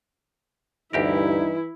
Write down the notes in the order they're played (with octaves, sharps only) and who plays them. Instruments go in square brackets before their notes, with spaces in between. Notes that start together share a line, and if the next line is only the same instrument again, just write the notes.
[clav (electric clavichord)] D2 G4 A#4 [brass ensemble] G2 D#4 [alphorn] E3 [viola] E4